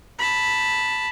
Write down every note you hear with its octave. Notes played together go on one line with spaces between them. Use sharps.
A5 B5